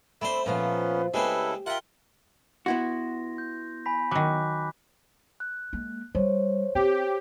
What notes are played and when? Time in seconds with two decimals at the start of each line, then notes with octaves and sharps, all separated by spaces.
0.21 A3 C4 D4 C5 B5
0.46 A#2 F3 B3 C#4 F4 B4
1.14 C#3 G#3 A3 C4 E4 G4 A4 B4
1.66 F4 A#4 E5 F#5 G5
2.66 B3 E4 F#4 C6 A#6
3.38 G6
3.86 G#5 B5 B6
4.11 D#3 F#3 D6 F#6
5.40 F#6
5.73 G#3 A#3
6.15 G3 C5 C#5
6.75 C4 G4